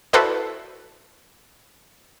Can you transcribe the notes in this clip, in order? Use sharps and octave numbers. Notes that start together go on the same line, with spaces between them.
E4 F#4 A4 B4 C5 D5